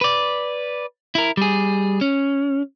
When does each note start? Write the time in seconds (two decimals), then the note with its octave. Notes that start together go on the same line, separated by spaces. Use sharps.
0.01 B4 D5
1.15 E4 A#4
1.37 G3 G#4
2.01 C#4